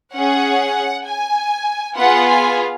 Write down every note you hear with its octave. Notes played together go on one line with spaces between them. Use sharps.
C#4 G#4 F#5
G#5
B3 F4 G#4 F#5
G#5